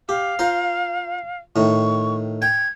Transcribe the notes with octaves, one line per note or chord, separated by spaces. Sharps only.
G4 F5
F4 C5 A#5
A2 D#3 C#6
G5 G#6